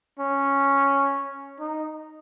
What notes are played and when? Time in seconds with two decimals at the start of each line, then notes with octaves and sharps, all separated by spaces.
0.19 C#4
1.60 D#4